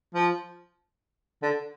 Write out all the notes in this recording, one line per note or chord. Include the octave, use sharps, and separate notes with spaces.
F3
D3